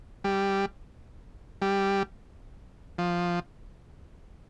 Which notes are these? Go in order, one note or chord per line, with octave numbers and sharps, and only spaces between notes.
G3
G3
F3